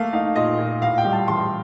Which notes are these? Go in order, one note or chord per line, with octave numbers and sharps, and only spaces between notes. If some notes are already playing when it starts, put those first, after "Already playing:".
Already playing: A3 A#3 F5
D#4 F5
A#2 D#5
A#2
A2 F5
G5
G3
A5
A1 C6